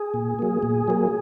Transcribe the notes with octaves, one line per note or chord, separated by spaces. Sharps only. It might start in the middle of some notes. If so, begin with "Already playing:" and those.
Already playing: G#4
A#2
F#3 A#3
A#2
F#3 A#3